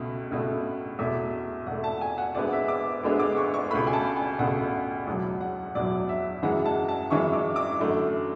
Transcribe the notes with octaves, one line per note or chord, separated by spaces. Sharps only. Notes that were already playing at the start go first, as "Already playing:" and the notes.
Already playing: C#2 B2 A3
C#2 B2 A3
E2 B2 A3 E5
E2 B2 A3 F#5
A5
G#5
F#5
D2 D3 G#3 B3 D5
E5
D6
D2 D3 G#3 B3
D6
C#6
C#6
C#2 B2 A3 B5
G#5
A5
G#5
C#2 B2 A3 F#5
E2 B2 F#3 F#5
F#5
E2 B2 F#3 D5
E5
F#2 E3 G#3 F#5
A5
A5
F#2 E3 G#3 C#6
D6
D6
F#2 D3 A3